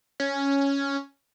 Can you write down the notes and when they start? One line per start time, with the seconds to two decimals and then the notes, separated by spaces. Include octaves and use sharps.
0.20 C#4